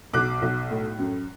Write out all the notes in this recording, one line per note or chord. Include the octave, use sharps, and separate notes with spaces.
B1 D6 F#6
B1
A2
F#2